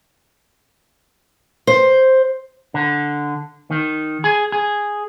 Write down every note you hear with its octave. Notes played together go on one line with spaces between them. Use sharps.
C5
D3
D#3
G#4
G#4